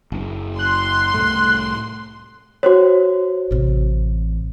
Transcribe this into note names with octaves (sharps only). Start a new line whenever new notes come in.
F#1
C6 F#6
C2 A2 A3
F#4 C5 C#5
A1 C3